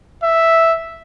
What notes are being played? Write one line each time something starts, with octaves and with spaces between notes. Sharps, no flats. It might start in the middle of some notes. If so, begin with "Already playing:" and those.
E5